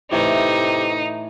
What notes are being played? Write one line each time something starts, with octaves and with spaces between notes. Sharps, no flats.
A2 C3 E3 D#4